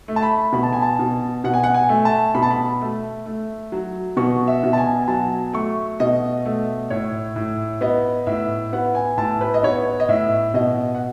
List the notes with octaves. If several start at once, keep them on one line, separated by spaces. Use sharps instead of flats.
A3
A5
B5
B2 B5
A5
G#5
A5
B2
B2 F#5
G#5
F#5
G#5
A3
A5
B2 B5
A5
B5
A3
A3
F#3
B2 C#6
E5
B2
A5
G#5
G#5
F#3 A5
A3 C#6
B2 D#5
A3
A2 C#5
A2
B3 D#5
A2 E5
B3 F#5
G#5
A2 A5
B4
D#5
B3 C#5
D#5
A2 E5
B2 D#5
F#5